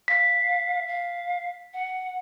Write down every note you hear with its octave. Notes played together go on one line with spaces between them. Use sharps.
F5 B6
F5
F#5